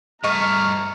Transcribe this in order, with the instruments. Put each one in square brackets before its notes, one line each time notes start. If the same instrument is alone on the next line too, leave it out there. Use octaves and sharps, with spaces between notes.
[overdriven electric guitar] G2 A3 [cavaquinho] D#5 C#6 [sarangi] A#5 [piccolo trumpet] F6